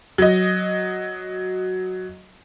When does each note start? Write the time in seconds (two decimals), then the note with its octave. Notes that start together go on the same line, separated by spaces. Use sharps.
0.18 F#3 D#5